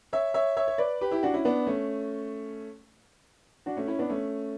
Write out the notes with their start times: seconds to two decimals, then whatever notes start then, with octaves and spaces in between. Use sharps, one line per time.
0.13 C#5 E5
0.34 C#5 E5
0.57 C#5 E5
0.68 C#5
0.78 B4 D5
1.01 G4 B4
1.11 E4 G4
1.23 D4 F#4
1.33 C#4 E4
1.45 B3 D4
1.67 A3 C#4
3.66 D4 F#4
3.77 A3 C#4
3.87 C#4 E4
3.99 B3 D4
4.10 A3 C#4